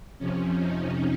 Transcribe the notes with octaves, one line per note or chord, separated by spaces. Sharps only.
F2 C3 F3 C#4
D#4